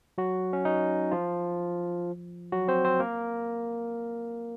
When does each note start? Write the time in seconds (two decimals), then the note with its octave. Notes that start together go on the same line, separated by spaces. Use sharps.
0.18 F#3 F#4
0.53 C#4
0.65 D#4
1.11 F3 F4
2.52 F#3 F#4
2.68 C4 C5
2.85 C4 C5
3.00 A#3 A#4